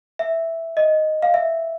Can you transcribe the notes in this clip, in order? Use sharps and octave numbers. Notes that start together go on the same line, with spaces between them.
E5
D#5
F5
E5